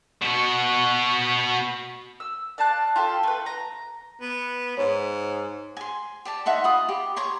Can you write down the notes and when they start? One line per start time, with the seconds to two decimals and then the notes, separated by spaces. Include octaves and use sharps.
0.22 B2 F#4
2.20 E6
2.58 D5 F5 A5 F#6
2.96 F4 G4 A4
3.23 A3 B4
3.46 A#5
4.21 B3
4.77 G#2 C#5
5.77 G#5 C6
6.25 G4 D5 A5
6.46 D#4 E5 F#5 C6
6.64 F4 B5 D#6
6.89 G4
7.16 C#5 A#5 C6 C#6